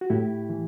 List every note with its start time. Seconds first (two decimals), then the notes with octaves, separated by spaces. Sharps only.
0.01 F#4
0.10 A2 E4 G4
0.50 E3